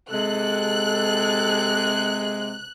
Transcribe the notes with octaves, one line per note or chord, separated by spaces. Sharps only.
C3 G#3 A4 F#6